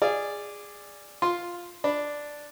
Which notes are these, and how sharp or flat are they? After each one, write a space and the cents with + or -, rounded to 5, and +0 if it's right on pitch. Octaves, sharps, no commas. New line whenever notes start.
G#4 -15 D5 +0 F5 -30
F4 +0 C6 +0
D4 +0 B5 +0